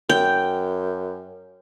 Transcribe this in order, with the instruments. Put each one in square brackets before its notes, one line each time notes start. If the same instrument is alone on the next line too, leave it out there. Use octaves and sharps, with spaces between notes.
[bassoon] F#2 [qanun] G5